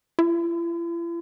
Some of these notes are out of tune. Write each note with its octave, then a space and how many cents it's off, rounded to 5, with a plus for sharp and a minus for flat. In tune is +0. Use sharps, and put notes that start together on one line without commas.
E4 +45